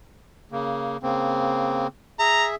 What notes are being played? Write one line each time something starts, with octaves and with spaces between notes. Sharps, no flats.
C#3 A#3
C#3 A#3 C4
G#4 E5 A#5